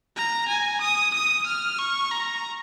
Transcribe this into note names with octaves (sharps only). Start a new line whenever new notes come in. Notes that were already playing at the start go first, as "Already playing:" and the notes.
A#5
G#5
D#6
D#6
F6
C#6
A#5